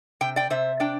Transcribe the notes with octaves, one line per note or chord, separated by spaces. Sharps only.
C3 G5
D5 G5
C3 C5 E5
D4 D5 G5